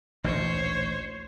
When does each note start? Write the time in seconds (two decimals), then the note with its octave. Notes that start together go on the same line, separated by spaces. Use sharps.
0.24 A1 D2 A#2 C5 C#5